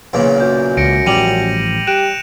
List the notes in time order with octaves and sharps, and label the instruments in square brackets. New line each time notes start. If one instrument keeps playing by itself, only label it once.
[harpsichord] B1 A#2 C#3 [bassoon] E2
[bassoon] F#2 [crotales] G6
[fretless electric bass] C#2 [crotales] A#6 C#7 D7
[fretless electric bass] A1 F3 [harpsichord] G3 [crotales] D#7 F7 F#7
[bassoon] G4 [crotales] F#6 D7 E7